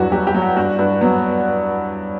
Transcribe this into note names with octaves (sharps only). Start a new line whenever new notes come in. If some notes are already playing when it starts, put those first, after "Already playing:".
Already playing: E2 G2 F#3 E4 F#4
F#3 G4
G4
F#3
F#4
G2 F#4
G2
F#3 B3